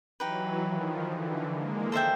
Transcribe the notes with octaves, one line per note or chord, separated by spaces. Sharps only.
E3 F#3 D#4 G4 B4
D#3 F3
D3 E3
G#3 A#3
A4 C5 E5 G5